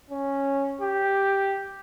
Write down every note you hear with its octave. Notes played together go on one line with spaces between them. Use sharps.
C#4
G4